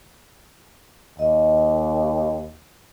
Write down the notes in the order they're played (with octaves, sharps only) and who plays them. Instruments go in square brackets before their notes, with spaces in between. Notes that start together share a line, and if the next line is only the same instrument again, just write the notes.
[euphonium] D#2 [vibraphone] D#5